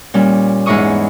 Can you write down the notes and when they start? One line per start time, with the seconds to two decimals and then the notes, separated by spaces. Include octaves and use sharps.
0.14 A#2 G3 C#4
0.66 E2 G#2 D#4 E4 C#6 D#6